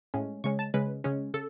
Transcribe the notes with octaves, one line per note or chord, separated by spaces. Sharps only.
A2 G#3 C#4
C#3 G#3 C#4 C#6
A5
C#3 G#3 C#4 B4
C#3 G#3 C#4
C#3 A4